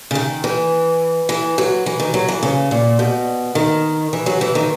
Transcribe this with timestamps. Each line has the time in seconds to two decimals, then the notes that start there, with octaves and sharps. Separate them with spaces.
0.11 C#3
0.15 D#3
0.44 E3
1.29 E3
1.58 F#3
1.86 E3
2.00 D#3
2.14 F#3
2.29 E3
2.43 C#3
2.71 A#2
2.99 B2
3.55 D#3
4.13 E3
4.26 F#3
4.41 E3
4.55 D#3